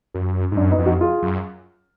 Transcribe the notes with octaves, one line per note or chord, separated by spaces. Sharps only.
F#2
G#2
F#2 D4
B3 D#4
F2
D#4 F#4
F4 G#4
F#2